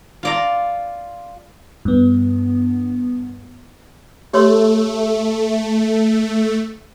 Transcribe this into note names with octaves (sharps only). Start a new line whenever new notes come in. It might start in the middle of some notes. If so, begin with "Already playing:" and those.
F4 D5 A#5
G2 B3
A3 G4 C#5 C6